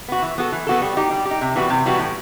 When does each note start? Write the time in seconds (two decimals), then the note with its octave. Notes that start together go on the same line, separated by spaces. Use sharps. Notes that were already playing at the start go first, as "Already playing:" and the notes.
0.08 B3 F#4
0.22 E3
0.38 B3 F#4 A4
0.52 E3
0.67 B3 F#4 A4
0.82 G3
0.97 D#4 G4
1.11 G3
1.25 G4
1.31 D#4
1.41 C3
1.55 E3 G3 B3 F#4
1.70 C3
1.86 E3 G3 B3 F#4
1.99 A2